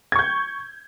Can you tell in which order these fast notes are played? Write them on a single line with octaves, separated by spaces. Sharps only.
G#6 C#6 G6